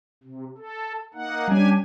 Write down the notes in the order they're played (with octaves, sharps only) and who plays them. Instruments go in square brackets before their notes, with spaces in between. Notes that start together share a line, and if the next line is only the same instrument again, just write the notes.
[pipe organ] C3
A4
A#3 D#4 F#5
[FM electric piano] G3 C#4 [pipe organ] D4 G4 G#5